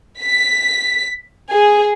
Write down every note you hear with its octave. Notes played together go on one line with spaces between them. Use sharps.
B6
G#4